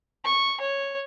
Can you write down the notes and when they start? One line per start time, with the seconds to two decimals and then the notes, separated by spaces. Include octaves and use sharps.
0.25 C#6
0.60 C#5